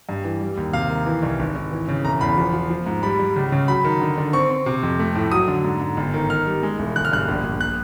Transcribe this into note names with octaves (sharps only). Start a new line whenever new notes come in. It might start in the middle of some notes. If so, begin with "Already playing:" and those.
G2
E3
G3
D#2
C3 F5
D#3
E3
C2
G#1
G#1
E3
C#3
E1 A#5
E2 B5
F3
F3
F3
G#2
G3 B5
G3
C#2
C#3
F#3 B5
D#3
D3
D3
C4 C#6
C4
C3
F2
A3
A2
F#3 D#6
D3
G#2
G#2
G1
D#3
D#3 F6
G3
G#3
E1
G1 F#6
F6
G2 F#6
A#1
A#1
F#6